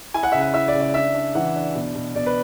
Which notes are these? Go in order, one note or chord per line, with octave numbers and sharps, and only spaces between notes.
E4 G#5
F#5
C#3 E5
F#5
E4 E5
D5
C#3
D5
D4 E5
D4
E3 F#5
D4
B2
B2
B2 D5
B4